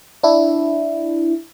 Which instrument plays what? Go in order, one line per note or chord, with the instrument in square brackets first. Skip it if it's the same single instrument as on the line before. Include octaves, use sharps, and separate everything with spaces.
[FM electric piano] D4 E4